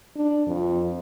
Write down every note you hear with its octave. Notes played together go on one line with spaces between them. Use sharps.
D4
F2